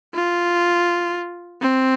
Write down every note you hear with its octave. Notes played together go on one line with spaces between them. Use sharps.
F4
C4